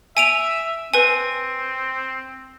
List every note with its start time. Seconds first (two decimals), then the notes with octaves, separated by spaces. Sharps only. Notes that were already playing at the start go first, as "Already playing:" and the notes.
0.17 E5 G#5 D7 F7
0.94 C4 B4 G#5